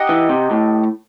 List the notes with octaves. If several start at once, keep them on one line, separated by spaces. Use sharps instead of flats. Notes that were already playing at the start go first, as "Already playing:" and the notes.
Already playing: D#4 G4 D#5 F#5
E3
C3
A2